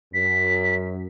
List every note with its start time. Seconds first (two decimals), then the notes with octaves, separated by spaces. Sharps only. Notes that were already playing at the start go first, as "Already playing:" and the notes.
0.14 F#2 B6